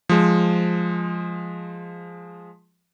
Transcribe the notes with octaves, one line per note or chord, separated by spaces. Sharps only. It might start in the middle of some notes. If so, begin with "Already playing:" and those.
F3 G#3